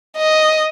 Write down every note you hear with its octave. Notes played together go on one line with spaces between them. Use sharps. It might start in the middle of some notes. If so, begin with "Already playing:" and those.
D#5